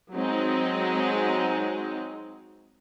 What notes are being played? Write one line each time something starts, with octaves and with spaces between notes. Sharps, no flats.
F#3 G#3 C4 D#4